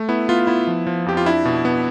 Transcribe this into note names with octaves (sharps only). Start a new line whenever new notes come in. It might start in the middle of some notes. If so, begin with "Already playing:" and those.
Already playing: A3
B3 E4
B3 F4
B3 E4
F3
F3
F2 G4
F4
D4 E4
B2
B3